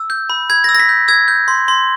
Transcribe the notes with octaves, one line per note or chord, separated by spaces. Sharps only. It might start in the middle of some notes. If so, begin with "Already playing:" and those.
Already playing: E6
G6
B5
B5 G#6
A#6
E6
A#6
B6
G6
E6 G#6
G6
C6
C6